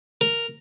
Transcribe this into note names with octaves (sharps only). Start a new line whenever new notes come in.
A#4